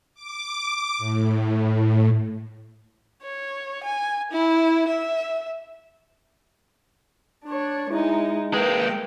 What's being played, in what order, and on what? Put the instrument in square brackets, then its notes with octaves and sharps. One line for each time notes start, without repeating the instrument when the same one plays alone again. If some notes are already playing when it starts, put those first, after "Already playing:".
[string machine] D6
A2
[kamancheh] C#5
G#5
E4
E5
[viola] D4 C#5
[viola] G#3 D#4 [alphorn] E4
[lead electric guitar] G#3 A#3 [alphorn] B4 [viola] G5